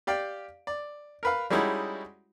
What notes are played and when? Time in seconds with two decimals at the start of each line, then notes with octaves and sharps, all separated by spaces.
0.07 G4 D5 F5 G5
0.67 D5
1.23 A#4 B4 F5
1.51 G3 G#3 C#4 D#4 E4 F#4